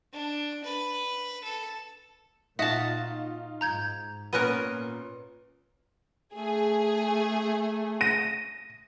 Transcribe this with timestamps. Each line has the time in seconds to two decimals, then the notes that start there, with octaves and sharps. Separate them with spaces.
0.13 D4
0.64 B4
1.44 A4
2.59 A#2 D#4 F4 F#4 E5 A5 D#6
3.61 G#2 A#5 G6 G#6
4.33 A#2 B3 C#4 A#4 F#6 D#7
6.35 A3 G#4
8.01 A#6 D#7